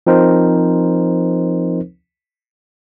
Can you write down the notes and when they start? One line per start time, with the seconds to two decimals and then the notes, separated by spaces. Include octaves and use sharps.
0.07 F3 C4 D#4 A#4 C5